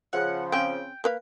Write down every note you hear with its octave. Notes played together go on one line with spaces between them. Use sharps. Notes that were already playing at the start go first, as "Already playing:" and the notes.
C#3 F3 F#5
C4 C#4 G5
A#3 B4 F5